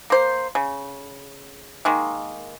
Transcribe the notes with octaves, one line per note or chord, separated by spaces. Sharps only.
A#3 C5
C#3
D#3 G#3 A#3